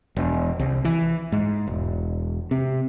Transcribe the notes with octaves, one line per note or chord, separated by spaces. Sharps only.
E1
C2
E3
G#2
E1
C3